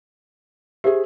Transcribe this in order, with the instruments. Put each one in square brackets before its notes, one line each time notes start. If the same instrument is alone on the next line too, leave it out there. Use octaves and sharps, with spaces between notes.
[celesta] G4 [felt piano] G#4 C5 E5